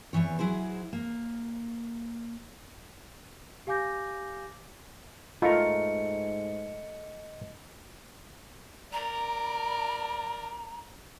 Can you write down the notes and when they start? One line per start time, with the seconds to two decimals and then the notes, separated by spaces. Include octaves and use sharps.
0.13 E2 A2 E3 C#5
0.39 F#3 E4 G#4 C5
0.93 A#3
3.67 G4 F5 G#5 D6 G6 A#6
5.42 G#2 A3 F4 A#4 D#5 C#7
8.92 A#4 D5 A#5